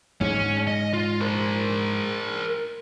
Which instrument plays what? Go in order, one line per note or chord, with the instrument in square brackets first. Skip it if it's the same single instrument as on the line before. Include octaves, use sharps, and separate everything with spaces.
[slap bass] G#2 G#3 [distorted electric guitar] C#4
[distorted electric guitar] D#5
F4
A#4 C5